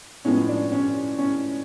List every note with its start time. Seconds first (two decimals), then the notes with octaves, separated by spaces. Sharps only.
0.25 A2 F3 G#3 B3 C#4
0.48 D4
0.72 C#4
1.19 C#4